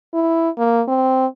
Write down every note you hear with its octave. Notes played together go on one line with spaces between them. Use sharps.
E4
A#3
C4